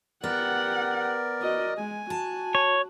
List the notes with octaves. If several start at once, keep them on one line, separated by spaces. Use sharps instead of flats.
B3 G4 A#4 D5 F#5
F#4 D#5
G#3 G#5
F#4 A5
C#5